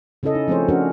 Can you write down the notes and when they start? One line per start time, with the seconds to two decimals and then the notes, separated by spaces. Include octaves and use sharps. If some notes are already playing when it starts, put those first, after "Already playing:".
0.23 C#3 C#4 E4 A4 D#5
0.35 D#4
0.48 F3 A3 C4 G#4 C5 C#5
0.68 F3 A3 C#4 D4 F#4 A#4